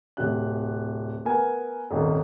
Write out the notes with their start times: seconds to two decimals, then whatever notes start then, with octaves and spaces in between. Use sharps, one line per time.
0.17 D1 C3 F#6
1.25 B3 A#4 G#5
1.91 D#1 G#1 D#3